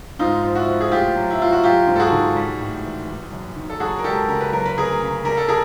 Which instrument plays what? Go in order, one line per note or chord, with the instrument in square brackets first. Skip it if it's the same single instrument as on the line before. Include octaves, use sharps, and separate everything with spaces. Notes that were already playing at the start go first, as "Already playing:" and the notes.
[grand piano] G#2 D#4 F4
F3
E4 F#4
F3
G#4
A2 F4 G4
F#3
E4
F#3 F4
F#4
F#3 F4 G4
G#2
A4
F#4 G#4
D#3
G3
A2
E3
G3
F#2
D#3
A4
F#3 F#4 G#4
A#4
C#2 G4 A4
C#3 A#4
B4
F#3 A#4
B4
D2 G#4 A#4
C#3
G3 A#4
A4
G#4 A#4